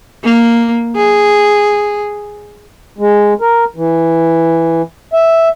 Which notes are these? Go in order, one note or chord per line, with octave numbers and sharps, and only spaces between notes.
A#3
G#4
G#3
A#4
E3
E5